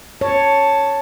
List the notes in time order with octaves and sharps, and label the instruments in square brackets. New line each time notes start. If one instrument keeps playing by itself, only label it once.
[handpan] C#5 [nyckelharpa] A5